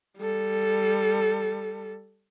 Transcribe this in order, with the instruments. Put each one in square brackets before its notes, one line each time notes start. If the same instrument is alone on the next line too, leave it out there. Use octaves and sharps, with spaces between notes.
[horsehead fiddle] G3 A4